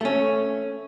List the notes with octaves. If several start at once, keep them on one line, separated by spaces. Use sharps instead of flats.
A3 C#4